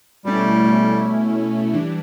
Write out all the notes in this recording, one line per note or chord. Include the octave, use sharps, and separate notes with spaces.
B2 G3 A3 C#4 E4
E3 G3 D4